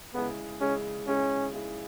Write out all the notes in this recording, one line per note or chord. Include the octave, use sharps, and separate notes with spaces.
C#3 G#3 B3 E4 G#4
C#3 G#3 C#4 E4 G#4
C#3 G#3 C#4 E4 G#4
C#3 G#3 E4 G#4